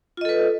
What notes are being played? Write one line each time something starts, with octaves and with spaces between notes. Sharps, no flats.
F4 A4 B4 D#5